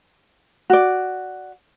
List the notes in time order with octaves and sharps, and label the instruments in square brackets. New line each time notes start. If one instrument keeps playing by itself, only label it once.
[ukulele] F#4 D5